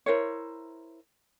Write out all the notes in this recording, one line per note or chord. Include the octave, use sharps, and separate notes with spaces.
E4 A#4 C5 C#5